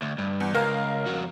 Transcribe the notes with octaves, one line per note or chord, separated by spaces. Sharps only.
D2
G2
E2
C#2 A#4 F5
F2 F#4